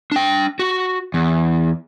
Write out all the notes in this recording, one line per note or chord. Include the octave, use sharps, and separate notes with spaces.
D4 G5
F#4
E2